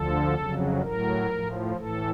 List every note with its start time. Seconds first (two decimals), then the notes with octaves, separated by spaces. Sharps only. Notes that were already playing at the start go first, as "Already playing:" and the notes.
Already playing: D2 D3 F3 A4
0.35 F2 C#3 F#3
0.82 A2 F#3 A#4
1.30 A2 F3
1.77 A2 A4
1.82 E3